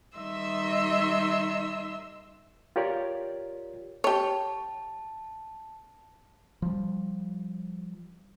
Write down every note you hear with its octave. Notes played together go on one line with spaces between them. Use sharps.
D#3 G3 D#5 E5 C6 E6
F4 G4 A#4 C#5 D5
G4 C#5 A5
F3 G3